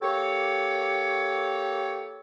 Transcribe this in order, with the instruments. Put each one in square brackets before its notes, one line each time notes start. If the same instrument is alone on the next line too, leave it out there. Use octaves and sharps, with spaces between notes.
[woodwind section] A#3 G4 A4 C#5